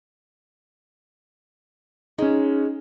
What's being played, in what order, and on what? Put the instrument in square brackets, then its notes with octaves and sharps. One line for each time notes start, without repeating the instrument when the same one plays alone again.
[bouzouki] G#3 [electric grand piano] C#4 D#4